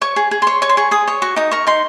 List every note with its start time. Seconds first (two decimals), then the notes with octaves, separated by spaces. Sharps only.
0.01 C#5 C#6
0.16 G#4
0.31 G#4
0.42 C#5 C6
0.62 C#5 C#6
0.69 C6
0.77 G#4 C#6
0.91 G#4 D#6
1.08 C#5
1.22 F#4 C#6
1.36 D#4 D#6
1.51 A#4 C#6
1.67 D#4 C6